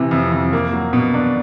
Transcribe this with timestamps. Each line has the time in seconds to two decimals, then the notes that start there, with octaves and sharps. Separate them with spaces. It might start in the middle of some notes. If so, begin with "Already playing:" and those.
Already playing: C3 E3
0.11 F2
0.32 F2
0.53 A#3
0.73 F#3
0.93 B2
1.14 D4